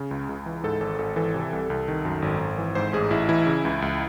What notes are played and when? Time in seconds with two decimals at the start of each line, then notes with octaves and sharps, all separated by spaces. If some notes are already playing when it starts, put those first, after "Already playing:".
Already playing: C#3
0.11 C#2
0.29 C#2
0.46 E3
0.64 G#2 A4
0.81 G#1 A4
0.98 G#1 A4
1.16 E3 A4
1.34 C3
1.53 C2
1.70 C2
1.88 D#3
2.05 F#2
2.22 G#1
2.41 G#1
2.58 E3
2.75 G#2 C5
2.93 A1 G#4
3.11 A1 E4
3.29 E3 E4
3.47 C#3
3.65 C#2
3.82 C#2